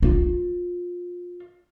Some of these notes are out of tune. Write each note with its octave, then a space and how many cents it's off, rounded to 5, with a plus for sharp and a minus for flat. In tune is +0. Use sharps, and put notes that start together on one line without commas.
F4 +20